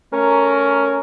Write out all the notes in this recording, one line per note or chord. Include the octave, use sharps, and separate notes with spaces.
A3 C#4 A#4